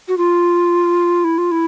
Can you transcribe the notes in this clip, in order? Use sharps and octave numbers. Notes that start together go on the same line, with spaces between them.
F#4
F4
E4
F4
E4